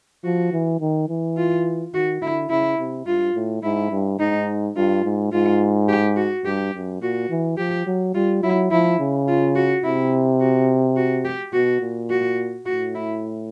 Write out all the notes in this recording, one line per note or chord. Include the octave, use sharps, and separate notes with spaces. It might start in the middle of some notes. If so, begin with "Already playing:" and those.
F3 F#4
E3
D#3
E3
F4
D#3 F#4
D3 E4
C#3 E4
C3
G2 F4
A2
G#2 E4
G2
G#2 D#4
G2 F4
G#2
G#2 F4
G4
F#4
G2 G4
F#2
A#2 F#4
E3
F3 G4
F#3
G3 F4
F#3 E4
F3 E4
C#3
F4
F#4
C3 E4
F#4
F#4
G4
B2 F#4
A#2
F#4
A2 F#4
E4